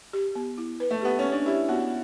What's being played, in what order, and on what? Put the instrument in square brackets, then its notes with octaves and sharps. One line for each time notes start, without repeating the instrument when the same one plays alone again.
[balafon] G4
B3
E4
B4
[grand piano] A3
[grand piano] B3 [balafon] G4
[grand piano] C#4
[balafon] C#5
[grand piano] D4
[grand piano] E4 [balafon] G4
[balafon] B3 [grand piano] F#4